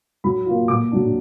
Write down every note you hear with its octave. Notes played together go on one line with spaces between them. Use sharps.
F#3 B5
A#3 F4
A#2 D6
F#3 D4